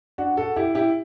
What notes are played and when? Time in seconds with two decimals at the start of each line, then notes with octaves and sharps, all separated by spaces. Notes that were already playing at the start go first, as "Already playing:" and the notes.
0.18 D4 F#4
0.37 F#4 A4
0.56 E4 G4
0.75 E4 G4